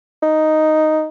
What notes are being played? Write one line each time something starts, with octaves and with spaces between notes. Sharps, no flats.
D#4